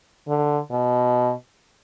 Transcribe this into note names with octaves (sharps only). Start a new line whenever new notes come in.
D3
B2